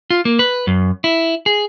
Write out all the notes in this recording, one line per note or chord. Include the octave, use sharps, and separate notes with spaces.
F4
A#3
B4
F#2
E4
G#4